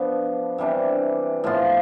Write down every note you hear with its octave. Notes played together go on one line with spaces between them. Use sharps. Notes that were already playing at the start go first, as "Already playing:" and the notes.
Already playing: F3 B3 D4
C3 E3 G3 D4
A2 F3 B3 F4